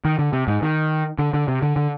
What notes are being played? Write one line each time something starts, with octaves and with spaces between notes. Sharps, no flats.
D#3
D3
C3
G#2
D#3
D3
D3
C3
D3
D3